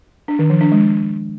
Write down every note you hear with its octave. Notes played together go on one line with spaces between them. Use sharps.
D4
D#3
F3
D4
G#3